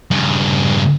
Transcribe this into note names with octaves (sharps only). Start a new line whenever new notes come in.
G2 C#3